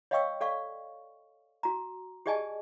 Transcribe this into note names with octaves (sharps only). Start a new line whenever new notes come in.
C#5 D#5 F5 G5 C#6 E6
A4 D5 F5 C#6
F#4 A#5
G4 G#4 D5 D#5 G#5 A5